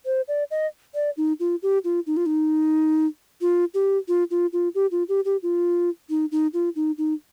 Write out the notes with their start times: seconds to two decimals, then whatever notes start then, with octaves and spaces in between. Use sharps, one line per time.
0.06 C5
0.28 D5
0.51 D#5
0.95 D5
1.17 D#4
1.40 F4
1.63 G4
1.84 F4
2.07 D#4
2.17 F4
2.26 D#4
3.41 F4
3.74 G4
4.08 F4
4.31 F4
4.53 F4
4.75 G4
4.92 F4
5.09 G4
5.25 G4
5.43 F4
6.10 D#4
6.32 D#4
6.54 F4
6.76 D#4
6.98 D#4